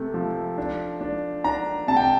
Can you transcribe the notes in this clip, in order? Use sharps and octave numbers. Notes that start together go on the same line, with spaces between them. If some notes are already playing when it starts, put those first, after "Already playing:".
Already playing: C3 A3
F3
D4
D4
D4 A#5
C3 A5
G5